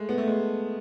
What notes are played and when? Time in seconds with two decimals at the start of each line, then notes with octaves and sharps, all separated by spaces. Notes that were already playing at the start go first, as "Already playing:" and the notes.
Already playing: G#3 A3
0.09 B3
0.18 A3
0.28 G#3